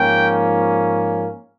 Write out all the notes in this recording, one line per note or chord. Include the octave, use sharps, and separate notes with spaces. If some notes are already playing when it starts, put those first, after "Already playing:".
Already playing: G#2 F3 A#3 C#4 G5